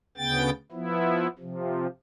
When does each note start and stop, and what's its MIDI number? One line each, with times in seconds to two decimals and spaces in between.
0.17 0.50 38
0.17 0.50 49
0.17 0.50 59
0.17 0.50 79
0.17 0.50 93
0.72 1.27 53
0.72 1.27 59
0.72 1.27 64
1.39 1.87 48
1.39 1.87 53